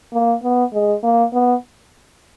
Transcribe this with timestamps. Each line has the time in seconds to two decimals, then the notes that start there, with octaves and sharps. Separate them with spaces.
0.13 A#3
0.43 B3
0.73 G#3
1.03 A#3
1.33 B3